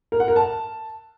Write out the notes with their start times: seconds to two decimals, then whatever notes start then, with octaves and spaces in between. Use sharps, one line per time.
0.12 A#4
0.20 F#5
0.28 A#4
0.36 A5